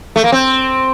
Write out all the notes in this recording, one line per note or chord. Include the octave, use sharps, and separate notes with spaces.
A3
A#3
C4